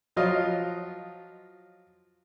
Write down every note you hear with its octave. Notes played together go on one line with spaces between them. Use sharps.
F3 F#3 F4 D#5